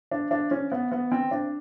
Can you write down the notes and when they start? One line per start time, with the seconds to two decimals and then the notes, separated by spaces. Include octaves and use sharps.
0.11 D4
0.31 D4
0.51 C#4
0.72 B3
0.92 B3
1.12 C4
1.31 D4